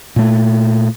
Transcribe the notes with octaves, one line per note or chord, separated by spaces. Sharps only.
A#2 A3